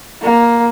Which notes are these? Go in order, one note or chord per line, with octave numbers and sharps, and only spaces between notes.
A#3